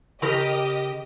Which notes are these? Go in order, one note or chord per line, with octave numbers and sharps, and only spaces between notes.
C#3 G4 A#4 D#5